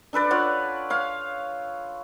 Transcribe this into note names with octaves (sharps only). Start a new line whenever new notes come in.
D4 A4 B4 D5
F4 C#5 D5 F#5
C#5 F5